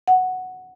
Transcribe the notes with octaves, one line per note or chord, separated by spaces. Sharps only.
F#5